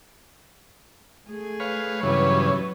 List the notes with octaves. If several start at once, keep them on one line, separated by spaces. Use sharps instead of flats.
A3 G#4
B4 C#5 F5
G2 C#3 E3 F#3 B4 C#5